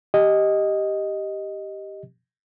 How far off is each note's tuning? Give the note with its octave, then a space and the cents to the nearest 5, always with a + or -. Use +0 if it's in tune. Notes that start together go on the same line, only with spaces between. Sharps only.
G4 +0 D#5 +0